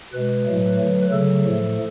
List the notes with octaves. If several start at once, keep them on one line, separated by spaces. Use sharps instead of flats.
B2 G#3 B4
A2 F#3 A3
D3 F#3 A3
C#3 F#3 A3 A4
A2 F3 A3